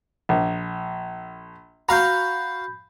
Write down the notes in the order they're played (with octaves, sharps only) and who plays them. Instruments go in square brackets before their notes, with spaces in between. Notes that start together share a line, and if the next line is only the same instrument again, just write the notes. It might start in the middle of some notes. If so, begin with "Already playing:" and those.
[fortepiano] A#1
[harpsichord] F#4 F5 [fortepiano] A#5 [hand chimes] B5 G6